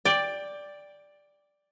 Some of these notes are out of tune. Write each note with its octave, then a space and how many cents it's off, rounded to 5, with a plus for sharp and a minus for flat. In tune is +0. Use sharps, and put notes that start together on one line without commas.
D5 +0 G5 +15